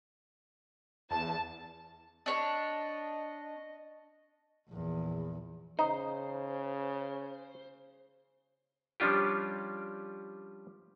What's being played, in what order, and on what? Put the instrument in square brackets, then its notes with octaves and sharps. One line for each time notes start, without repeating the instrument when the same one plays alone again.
[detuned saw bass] E2 [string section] A5
[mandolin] D4 C#5 [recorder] D#5
[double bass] A#1 E2
[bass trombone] C#3 [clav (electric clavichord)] D#4 [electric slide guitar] C5
[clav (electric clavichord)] F3 G3 C#4 D4 F4 G4